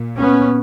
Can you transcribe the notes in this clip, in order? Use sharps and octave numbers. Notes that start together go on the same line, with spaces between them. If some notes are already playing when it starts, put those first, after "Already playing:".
Already playing: A#2
B3 C#4